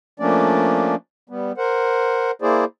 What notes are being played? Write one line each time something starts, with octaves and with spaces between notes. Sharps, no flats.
F3 A3 A#3 C#4 D4 D5
G3 B3
A#4 C5 F#5
A#3 E4 G#4 C5 D5